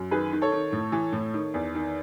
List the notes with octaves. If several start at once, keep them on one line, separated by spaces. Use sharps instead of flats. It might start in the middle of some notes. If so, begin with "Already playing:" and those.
Already playing: F#2
D#3 G#4 B4
D#3
A4 C#5
D#3
A2
E3
A2
D#3
E2
D#3